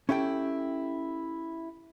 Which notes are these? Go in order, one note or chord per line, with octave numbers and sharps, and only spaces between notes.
C#4 E4 G4 A4 G5